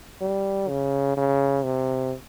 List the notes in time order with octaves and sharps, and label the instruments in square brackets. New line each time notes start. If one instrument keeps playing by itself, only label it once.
[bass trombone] G3
C#3
C#3
C3